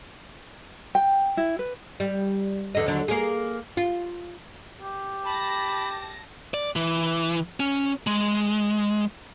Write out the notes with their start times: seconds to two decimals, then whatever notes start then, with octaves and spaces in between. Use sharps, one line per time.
0.95 G5
1.37 E4
1.59 B4
2.00 G3
2.75 E2 D3 D#5
2.86 D#2 D3 F#3
3.08 A#3 G#4
3.77 F4
4.81 G4
5.25 A5 B5 A#6
6.54 D5
6.76 E3
7.60 C#4
8.07 G#3